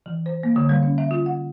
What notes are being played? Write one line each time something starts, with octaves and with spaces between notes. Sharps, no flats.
E3
C5
A#3
D3
G3
C#4
E5
F4
F#5